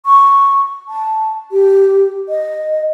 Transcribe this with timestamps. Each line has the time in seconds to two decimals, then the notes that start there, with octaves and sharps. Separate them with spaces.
0.06 C#6
0.89 A5
1.52 G4
2.29 D#5